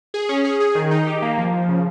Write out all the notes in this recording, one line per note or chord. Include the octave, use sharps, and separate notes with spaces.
G#4
C#4
G#4
G#4
D#3
D#4
G4
A#3
F3
F3
C#3